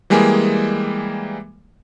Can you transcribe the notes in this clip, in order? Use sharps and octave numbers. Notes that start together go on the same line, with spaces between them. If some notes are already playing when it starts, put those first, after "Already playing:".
E3 G3 G#3 A#3 G#4